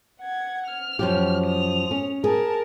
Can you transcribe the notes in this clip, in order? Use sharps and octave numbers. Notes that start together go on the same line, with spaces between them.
F#5 G#6
F6
F#2 F3 G4
D#6 F7
C#4
G#4 A#4 A5